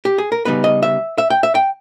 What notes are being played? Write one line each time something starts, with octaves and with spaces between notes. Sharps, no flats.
G4
G#4
A#4
C#3 G3 B3 D#4 B4
D#5
E5
E5
G5
E5
G5